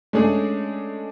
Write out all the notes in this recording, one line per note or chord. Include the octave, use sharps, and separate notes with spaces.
G#3 A3 C#4 D4 G#4